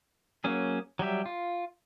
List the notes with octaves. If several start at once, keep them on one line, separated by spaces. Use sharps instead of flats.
F#3 A#3 C#4 G#4
F#3 G3 G4 E5
F4